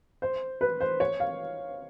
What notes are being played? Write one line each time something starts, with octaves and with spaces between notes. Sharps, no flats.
C5
B4
C5
C#5
F5